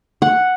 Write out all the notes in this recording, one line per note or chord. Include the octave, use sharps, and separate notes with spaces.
F#5